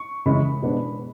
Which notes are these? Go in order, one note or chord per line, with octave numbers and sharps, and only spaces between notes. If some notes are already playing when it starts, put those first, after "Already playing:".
Already playing: C#6
C#3 E3 G#3 C#4 B5
B2 G#3 B3 D4